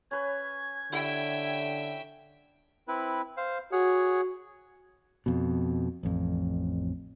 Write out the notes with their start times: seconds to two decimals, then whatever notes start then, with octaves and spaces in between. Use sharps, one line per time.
0.11 C#4 B4 G#6
0.92 D3 E4 G4 E5 G5 B5
2.88 C4 E4 B4
3.37 C5 F5
3.72 F#4 G#4 C#5 F#5
5.26 F2 B2
6.03 A1 F2